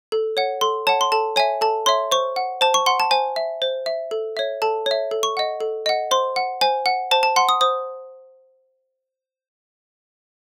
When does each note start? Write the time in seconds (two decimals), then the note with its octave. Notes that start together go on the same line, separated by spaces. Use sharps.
0.12 A4
0.37 C#5 F#5
0.61 A4 C6
0.87 C#5 F#5 A5
1.01 C6
1.12 A4 A5
1.36 C#5 E5 G#5
1.61 A4 A5
1.86 C#5 E5 C6
2.12 C5 C#6
2.36 F#5
2.61 C5 A5
2.74 C#6
2.86 F#5 C6
3.00 A5
3.11 C5 G#5
3.36 E5
3.62 C5
3.86 E5
4.11 A4
4.37 C#5 E5
4.62 A4 A5
4.86 C#5 E5
5.11 A4
5.23 C#6
5.37 D#5 F#5
5.61 A4
5.86 D#5 F#5
6.11 C5 C6
6.36 F#5
6.61 C5 G#5
6.86 F#5
7.11 C5 A5
7.23 A5
7.36 F#5 C6
7.49 D#6
7.61 C5 D#6